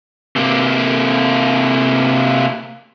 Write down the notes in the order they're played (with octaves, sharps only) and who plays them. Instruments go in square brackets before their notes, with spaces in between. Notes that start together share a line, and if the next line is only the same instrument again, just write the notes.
[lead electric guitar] C3 A#3